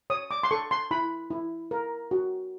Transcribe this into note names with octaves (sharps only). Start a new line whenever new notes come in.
C#5 D#6
D6
C6
A4 C#6
C6
E4 B5
E4
A#4
F#4